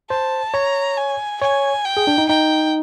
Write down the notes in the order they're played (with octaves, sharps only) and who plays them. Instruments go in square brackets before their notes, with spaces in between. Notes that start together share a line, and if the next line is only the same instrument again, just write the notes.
[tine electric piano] C5 [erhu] A5
[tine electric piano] C#5 [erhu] A#5
[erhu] G#5
[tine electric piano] C#5 [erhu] G#5
[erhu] G5
[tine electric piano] G#4
D4
D#4
[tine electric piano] D#4 [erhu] G5